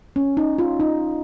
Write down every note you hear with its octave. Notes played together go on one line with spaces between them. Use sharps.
C#4
D#4
F4
D#4